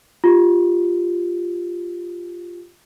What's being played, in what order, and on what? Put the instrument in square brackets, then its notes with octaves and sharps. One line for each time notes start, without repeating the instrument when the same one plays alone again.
[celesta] F4 G4